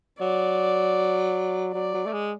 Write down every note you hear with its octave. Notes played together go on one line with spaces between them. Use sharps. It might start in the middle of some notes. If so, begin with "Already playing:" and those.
F#3 D5
F#3 D5
F#3
A3
G#3